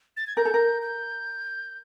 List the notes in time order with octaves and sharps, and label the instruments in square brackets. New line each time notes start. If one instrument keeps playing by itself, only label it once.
[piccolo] A6
G#6
[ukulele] A#4 [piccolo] G6
[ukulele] A4
A#4
[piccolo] G6